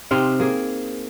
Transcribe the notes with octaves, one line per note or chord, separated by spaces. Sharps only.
C3 C4 D#4 F5
A#3 G#4